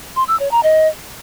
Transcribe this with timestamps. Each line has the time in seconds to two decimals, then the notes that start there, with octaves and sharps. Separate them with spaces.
0.16 C6
0.28 E6
0.39 C#5
0.51 A#5
0.63 D#5